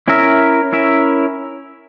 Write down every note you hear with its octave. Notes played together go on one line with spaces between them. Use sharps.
C#4 E4 A#4 E5
C#4 E4 A#4 E5